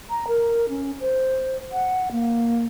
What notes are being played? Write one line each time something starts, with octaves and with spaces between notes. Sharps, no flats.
A#5
A#4
C#4
C5
F#5
A#3